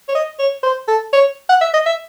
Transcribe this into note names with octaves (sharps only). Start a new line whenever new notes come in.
C#5
D#5
C#5
C5
A4
C#5
F#5
E5
D#5
E5